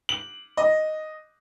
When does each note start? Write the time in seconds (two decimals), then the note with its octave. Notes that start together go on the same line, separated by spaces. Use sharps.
0.09 F#7
0.57 D#5